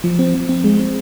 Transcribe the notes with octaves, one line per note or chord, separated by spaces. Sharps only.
F3
C4
F3
C4
G#3
C4